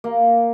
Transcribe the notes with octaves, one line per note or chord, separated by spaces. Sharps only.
A#3